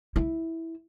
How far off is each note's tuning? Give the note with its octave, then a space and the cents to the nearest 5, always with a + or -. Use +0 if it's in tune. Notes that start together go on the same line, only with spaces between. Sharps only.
E4 -10